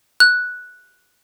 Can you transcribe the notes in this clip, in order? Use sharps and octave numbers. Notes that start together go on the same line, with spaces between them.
F#6